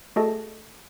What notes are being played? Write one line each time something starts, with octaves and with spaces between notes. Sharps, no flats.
A3 F#4 G#4 A4 D#5 A5